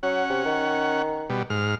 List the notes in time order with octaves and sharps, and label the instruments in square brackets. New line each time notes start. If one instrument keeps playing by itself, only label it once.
[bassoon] F#3 [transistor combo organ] C#4 F#5
[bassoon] C3
D#3
[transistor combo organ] B2 G3
G#2 F6